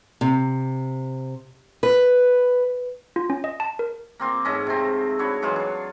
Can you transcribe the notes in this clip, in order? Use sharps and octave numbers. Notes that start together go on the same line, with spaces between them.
C3
B4
F4
C#4
D#5
A5
A#4
A#3 C4 F4
G#2 A3 C#4 D#5
C3 C4
D4 E4 F#4 C#5
E3 F#3 G#3 F4
D4 C#5